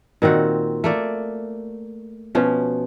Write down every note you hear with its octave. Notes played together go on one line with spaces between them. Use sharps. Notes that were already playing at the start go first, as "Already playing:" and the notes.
A#2 D#3 C4 F#4
A3 A#3 D5
B2 F3 C#4